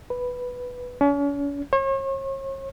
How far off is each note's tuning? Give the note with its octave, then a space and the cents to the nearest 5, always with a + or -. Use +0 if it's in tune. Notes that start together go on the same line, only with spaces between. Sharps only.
B4 +0
C#4 +40
C#5 -40